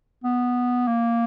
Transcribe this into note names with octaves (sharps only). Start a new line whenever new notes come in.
B3
A#3